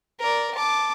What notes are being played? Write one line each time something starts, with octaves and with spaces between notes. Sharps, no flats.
A#4 D5
A5 D6